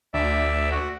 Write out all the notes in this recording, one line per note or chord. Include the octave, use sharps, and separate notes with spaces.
D2 D5 E5
F#4